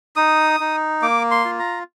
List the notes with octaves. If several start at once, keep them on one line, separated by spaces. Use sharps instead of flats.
D#4 D#6
D#4
A#3 D6
C6
F4
A#5